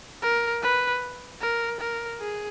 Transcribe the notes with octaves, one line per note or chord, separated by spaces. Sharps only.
A#4
B4
A#4
A#4
G#4